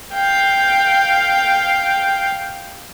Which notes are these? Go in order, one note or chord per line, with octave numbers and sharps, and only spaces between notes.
F5 G5